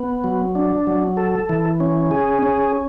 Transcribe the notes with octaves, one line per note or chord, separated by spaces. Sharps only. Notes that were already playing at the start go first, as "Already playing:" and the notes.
Already playing: B3
F#3
D4
F#3
A4
E3
C#4
G#4
C#4